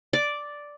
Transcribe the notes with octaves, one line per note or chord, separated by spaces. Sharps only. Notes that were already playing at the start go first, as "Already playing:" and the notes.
D5